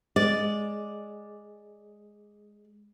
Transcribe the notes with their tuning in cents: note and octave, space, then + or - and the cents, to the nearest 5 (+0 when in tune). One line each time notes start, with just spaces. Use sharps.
G#3 +0 D5 +0